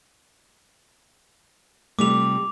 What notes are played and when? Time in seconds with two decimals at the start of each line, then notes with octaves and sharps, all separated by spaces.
1.99 C3 G3 A3 F4 D6 F7